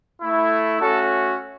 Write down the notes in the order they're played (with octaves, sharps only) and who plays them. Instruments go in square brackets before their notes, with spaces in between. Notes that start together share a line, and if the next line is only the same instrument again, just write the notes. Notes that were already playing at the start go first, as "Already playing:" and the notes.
[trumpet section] A3 E4
A3 C#4 F#4 A4